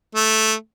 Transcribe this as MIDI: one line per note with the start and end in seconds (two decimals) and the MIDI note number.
0.15 0.53 57